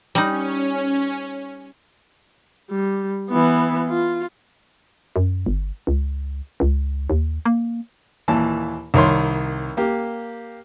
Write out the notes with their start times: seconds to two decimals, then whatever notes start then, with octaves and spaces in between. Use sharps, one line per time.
0.15 G3 C#4 D#4
2.70 G3
3.31 E3 B3
3.89 F4
5.16 F#2
5.46 G1
5.87 C#2
6.60 C#2
7.10 D#2
7.45 A#3
8.28 D#2 A#2 E3 A5
8.94 C2 D#3 C#5 C6
9.77 A#3 G4